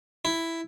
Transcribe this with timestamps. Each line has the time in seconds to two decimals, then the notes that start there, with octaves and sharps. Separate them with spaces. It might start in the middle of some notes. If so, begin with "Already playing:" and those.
0.25 E4